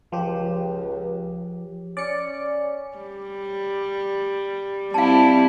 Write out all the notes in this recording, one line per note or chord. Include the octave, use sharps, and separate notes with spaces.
C#2 F3 G4
C#4 D5 C#7
G3
G3 C4 E4 F5 A5